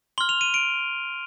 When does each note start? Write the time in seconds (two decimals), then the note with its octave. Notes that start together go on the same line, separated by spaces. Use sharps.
0.18 C6 F6 G7
0.29 F7
0.41 D#7
0.54 D7